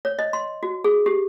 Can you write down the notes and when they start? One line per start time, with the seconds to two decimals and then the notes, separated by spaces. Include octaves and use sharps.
0.05 C#5
0.19 D#5
0.33 C6
0.63 F#4
0.84 G#4
1.06 G4